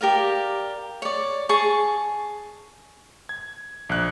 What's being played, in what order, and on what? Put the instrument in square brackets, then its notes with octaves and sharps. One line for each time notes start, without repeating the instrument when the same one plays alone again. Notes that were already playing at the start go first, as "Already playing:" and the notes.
[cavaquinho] G4 A#4 D5 F5
C#5 D5
G#4 A5 C#6
[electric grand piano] G#6
A#1 F#6